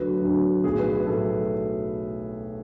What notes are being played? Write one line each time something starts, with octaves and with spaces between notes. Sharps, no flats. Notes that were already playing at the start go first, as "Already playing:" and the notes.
Already playing: D2 D3 F#3 B4
D2 D3 F#3
B1 A2 F#3 G#4
B4
B4
A2 F#3 A4